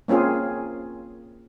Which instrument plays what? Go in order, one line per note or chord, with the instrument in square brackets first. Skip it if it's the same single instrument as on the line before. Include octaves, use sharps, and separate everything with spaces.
[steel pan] A#3 C4 C#4 F4 G#4